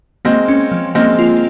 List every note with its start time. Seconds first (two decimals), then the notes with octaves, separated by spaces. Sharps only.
0.25 G#3 A#3 C4
0.48 C#4
0.72 F3
0.95 G#3 A#3 C4
1.19 F4